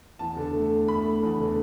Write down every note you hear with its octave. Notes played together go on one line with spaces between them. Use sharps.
E2 A5
D3
A3
A3
A3 B5
A3
E2
D3